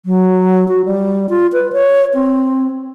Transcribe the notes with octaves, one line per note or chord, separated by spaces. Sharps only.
F#3
F#4
G3
F4
B4
C#5
C4